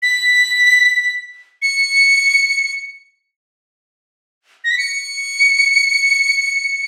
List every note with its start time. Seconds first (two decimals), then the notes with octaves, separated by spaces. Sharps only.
0.02 B6
1.62 C#7
4.64 A#6
4.71 B6
4.78 C#7